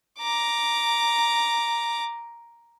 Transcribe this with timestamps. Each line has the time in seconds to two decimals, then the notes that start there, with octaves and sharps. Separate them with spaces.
0.19 A#5 D6